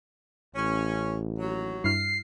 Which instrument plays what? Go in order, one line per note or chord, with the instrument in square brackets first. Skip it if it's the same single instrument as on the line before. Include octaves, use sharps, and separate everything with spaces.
[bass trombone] A1 [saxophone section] C#4
[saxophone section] D#2 F#3
[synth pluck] G2 E4 F6 [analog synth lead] C7